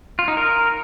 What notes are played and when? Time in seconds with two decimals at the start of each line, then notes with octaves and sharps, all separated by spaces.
0.19 F4
0.28 D#4
0.37 A#4